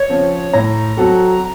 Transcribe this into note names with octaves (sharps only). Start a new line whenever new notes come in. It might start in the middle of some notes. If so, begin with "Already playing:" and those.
Already playing: C#5
C#3 F3 C4
A2 A#5
F#3 C4 F#4 A4